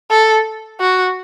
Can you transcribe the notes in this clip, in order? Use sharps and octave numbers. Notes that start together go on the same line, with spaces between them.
A4
F#4